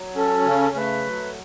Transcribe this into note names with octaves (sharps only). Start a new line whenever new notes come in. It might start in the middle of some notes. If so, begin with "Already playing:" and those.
Already playing: F#3
C#4 A4
C#3
A3 B4
F#3